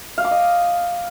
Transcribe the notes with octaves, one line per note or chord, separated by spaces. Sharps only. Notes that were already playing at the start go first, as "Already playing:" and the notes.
F5
D6
D#5